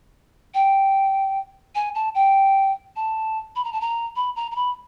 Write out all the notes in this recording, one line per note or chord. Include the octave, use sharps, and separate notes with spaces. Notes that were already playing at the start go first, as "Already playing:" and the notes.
G5
G#5
A5
G5
A5
B5
A#5
A5
A#5
B5
A#5
A#5
B5